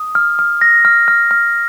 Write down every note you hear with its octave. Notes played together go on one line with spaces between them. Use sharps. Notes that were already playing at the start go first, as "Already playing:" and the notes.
Already playing: D#6
F6
F6
A#6
F6
F6
F6